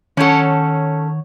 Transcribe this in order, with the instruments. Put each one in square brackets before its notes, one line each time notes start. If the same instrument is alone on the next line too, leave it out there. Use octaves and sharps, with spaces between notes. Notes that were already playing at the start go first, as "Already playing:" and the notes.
[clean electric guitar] D#3 C#5 F#5 [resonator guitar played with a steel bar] C#4 A4